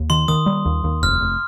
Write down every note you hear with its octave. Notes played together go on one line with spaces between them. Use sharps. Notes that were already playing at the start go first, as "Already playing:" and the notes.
Already playing: D#2
D#3 C6
D#3 D#6
G3
D#2
D#2
F1 F6
F1